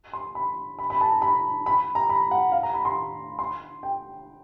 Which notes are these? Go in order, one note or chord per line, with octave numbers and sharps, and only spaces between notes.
C6
B5
B5
B5
A5
A#5
B5
B5
A#5
B5
F#5
F5
A#5
B5
C6
C6
G5